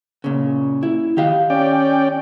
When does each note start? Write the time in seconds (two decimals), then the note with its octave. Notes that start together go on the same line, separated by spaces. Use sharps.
0.24 A#2 C#3
0.83 E4
1.17 D#3 G4 F5
1.50 C#4 D5 G5